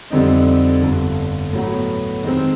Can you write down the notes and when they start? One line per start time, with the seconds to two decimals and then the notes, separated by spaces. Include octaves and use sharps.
0.10 F2 D3 G3 C4 D#4
0.82 G1 G2 D3
1.53 A2 F#3 B3
2.24 D#3 G#3 C4